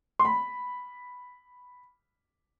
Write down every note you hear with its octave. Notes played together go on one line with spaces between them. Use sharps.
C6
B5